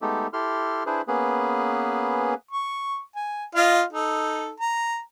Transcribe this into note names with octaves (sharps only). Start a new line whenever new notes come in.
G#3 A3 B3 D#4 G4 A4
E4 G4 A4 C6 F6
D4 E4 G#4 B4 C5
A#3 B3 C#4 G#4 B4
C#6
G#5
F4 D#5 F5
D#4 A4
A#5